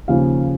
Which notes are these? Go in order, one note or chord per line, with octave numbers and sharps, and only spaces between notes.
D#2 C#3 F3 F5